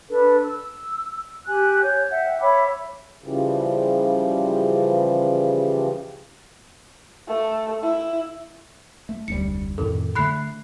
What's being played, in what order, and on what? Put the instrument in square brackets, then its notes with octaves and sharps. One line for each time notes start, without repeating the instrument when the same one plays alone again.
[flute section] D4 A4 B4
E6
G4 G#5 F#6
C#5 G6
E5 F#5 G5
C#5 E5 B5 D6
[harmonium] C#3 E3 F3 G3
[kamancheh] A3
E4
[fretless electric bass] A3
[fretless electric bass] F1 D2 G3 [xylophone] C#7
[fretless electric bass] F2 A2 D#3 [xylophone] A4
[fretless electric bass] D3 A3 [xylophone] B5 F#6 C7